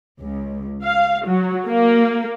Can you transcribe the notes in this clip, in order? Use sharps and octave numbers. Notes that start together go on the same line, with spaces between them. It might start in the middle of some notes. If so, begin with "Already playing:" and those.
C#2
F5
F#3
A#3